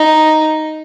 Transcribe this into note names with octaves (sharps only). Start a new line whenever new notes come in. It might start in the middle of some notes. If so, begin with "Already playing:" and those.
Already playing: D#4